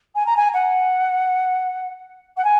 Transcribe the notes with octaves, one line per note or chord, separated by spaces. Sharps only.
G#5
A#5
G#5
F#5
F#5
G#5